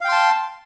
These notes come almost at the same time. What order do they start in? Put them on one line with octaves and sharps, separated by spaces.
F5 G5 C6 A5